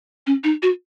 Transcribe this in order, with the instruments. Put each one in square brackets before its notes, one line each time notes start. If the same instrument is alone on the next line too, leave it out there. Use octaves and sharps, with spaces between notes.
[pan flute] C#4
D#4
F#4